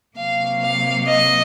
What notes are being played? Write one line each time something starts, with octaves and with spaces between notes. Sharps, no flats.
C3 F#3 A#3 F5
F5
D#5